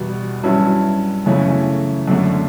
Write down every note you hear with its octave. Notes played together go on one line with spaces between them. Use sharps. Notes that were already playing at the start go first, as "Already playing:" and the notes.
Already playing: E2 B2 G3
G2 F#3 C#4 E4
F#2 C#3 E3 A3 C#4
F#2 D3 A3